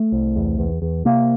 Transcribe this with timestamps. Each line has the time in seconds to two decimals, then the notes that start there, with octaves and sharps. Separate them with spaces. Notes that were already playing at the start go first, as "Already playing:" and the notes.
Already playing: A3
0.12 C2
0.36 E2
0.59 E2
0.82 E2
1.05 C3 A#3